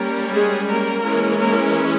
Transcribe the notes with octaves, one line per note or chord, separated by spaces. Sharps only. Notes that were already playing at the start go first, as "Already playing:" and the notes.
Already playing: G3 A#3 C#4 A#4
G#3 G#4
A#3 A#4
E3 G#3 C#4
A#3 A#4